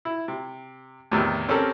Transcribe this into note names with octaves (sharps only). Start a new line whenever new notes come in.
E4
C3
E2 A2 C3 D#3
C4 C#4 G4 A4 A#4